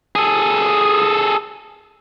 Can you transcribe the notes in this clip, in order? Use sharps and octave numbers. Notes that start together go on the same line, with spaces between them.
G#4 A4